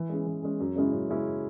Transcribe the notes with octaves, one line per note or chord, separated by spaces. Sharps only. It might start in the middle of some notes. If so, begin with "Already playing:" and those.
Already playing: E3
G#3 C#4 G#4
E3
G#3 C#4 G#4
F#2
C#3 G#3 C#4 E4
F#2
C#3 G#3 C#4 E4